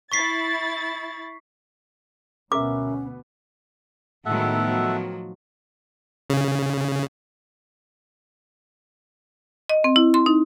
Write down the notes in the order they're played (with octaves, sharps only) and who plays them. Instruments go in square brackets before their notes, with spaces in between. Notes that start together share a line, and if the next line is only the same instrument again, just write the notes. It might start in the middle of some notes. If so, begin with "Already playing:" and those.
[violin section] E4 A6 [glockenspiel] C#6 B6 C7
[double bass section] D2 B2 B3 [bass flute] C#4 [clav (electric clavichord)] A#4 E5 [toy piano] D6
[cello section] A2 D#3 B3 [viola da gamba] F#3 G#3 [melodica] A4 E5 F#5
[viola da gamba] F3 F#3
[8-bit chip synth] C#3
[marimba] D#5
C4
E4
C6
D#4